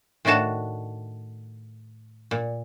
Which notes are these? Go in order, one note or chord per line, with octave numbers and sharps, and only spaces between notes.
A2 D#3 D4 F#4 A5
A#2